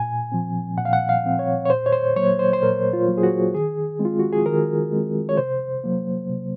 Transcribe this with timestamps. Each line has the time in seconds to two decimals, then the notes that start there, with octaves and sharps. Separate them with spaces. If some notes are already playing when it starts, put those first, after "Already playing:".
Already playing: A#2 G#5
0.32 F3 C4
0.78 A#2 F#5
0.85 F5
0.93 F#5
1.09 F5
1.24 F3 C4
1.39 C#5
1.66 C#5
1.70 A#2 C5
1.86 C#5
1.93 C5
2.16 F#3 A#3 C#5
2.39 C5
2.53 C5
2.63 A#2 A#4
2.93 F4
3.08 F#3 A#3
3.18 G#4
3.23 F#4
3.54 D#3 G#4
3.99 G#3 C4
4.05 F4
4.19 F#4
4.32 G#4
4.46 D#3 A#4
4.93 G#3 C4
5.29 C#5
5.37 C3 C5
5.84 F#3 A#3
6.30 C3